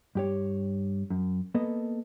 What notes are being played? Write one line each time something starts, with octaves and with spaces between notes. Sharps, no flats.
G2 G4 C#5
F#2
A#3 B3 A4 D#5